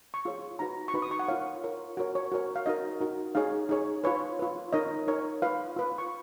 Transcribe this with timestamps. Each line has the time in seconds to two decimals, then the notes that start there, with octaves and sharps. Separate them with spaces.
0.14 C#6
0.25 F4 G#4 C#5
0.59 D#4 F#4 B4 A#5
0.88 C#6
0.94 D#4 F#4 B4 B5
1.02 D#6
1.11 C#6
1.19 F#5
1.28 F4 A#4 C#5 F5
1.64 F4 A#4 C#5
1.97 F#4 A#4 C#5
2.15 C#5
2.32 F#4 A#4 C#5
2.56 F5
2.66 D#4 F#4 A#4 D#5
3.00 D#4 F#4 A#4
3.35 D#4 G#4 C#5 F5
3.69 D#4 G#4 C#5
4.04 F4 B4 C#5
4.39 F4 B4
4.72 D#4 A#4 C#5 D#5
5.07 D#4 A#4 C#5
5.42 F4 B4 F5
5.76 F4 B4
5.98 C#6